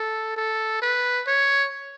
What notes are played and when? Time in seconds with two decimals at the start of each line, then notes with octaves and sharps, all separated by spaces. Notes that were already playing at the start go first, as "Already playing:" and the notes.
Already playing: A4
0.37 A4
0.82 B4
1.27 C#5